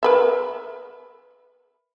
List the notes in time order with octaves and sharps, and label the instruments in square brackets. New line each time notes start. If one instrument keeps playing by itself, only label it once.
[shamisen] A#4 B4 E5